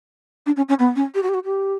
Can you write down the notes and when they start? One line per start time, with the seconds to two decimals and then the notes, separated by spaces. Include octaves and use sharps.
0.46 D4
0.56 C#4
0.69 C#4
0.79 B3
0.96 C#4
1.15 G4
1.23 F#4
1.29 G4
1.34 F#4
1.45 G4